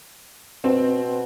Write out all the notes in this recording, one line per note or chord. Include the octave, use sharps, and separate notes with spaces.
B2 C4